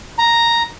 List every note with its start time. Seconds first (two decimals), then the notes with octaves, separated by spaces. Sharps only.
0.19 A#5